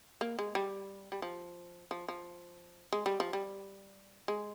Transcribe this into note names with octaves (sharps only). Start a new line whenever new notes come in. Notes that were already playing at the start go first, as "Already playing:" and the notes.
A#3
G#3
G3
G3
F3
F3
F3
G#3
G3
F3
G3
G#3